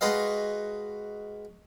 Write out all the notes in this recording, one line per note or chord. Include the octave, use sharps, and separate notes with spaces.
G#3 F#4 B4 D#5 F5